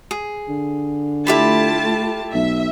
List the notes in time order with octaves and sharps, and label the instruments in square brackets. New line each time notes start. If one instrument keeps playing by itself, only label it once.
[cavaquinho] G#4
[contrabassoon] D3
[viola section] A3 F4 A5 [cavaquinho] E4 G4 B5
[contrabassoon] B1 [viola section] E5